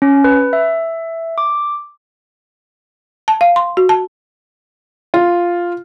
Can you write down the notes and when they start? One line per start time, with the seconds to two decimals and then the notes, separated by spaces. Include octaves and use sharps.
0.02 C#4
0.24 B4
0.53 E5
1.38 D6
3.28 A5
3.41 F5
3.56 C6
3.77 F#4
3.89 A5
5.14 F4